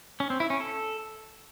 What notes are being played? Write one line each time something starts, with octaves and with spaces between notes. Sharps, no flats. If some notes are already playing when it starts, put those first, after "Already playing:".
C#4
C4
E4
C#4
A4